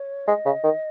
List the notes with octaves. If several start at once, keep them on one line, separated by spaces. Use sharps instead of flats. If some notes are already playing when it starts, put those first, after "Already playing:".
Already playing: C#5
G#3 D#5
C#3
D#3